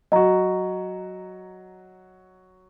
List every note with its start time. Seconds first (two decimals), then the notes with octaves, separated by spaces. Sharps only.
0.12 F#3 F#4 D#5 A#5